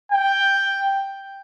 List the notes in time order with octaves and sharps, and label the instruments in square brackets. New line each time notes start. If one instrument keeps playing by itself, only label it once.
[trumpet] G5